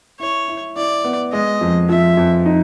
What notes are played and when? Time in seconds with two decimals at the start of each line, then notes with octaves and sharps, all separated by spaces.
0.20 E4 C#5
0.48 E4
0.76 E4 D5
1.04 B3
1.33 G#3 D#5
1.61 F2
1.89 F3 E5
2.17 F2
2.46 D#4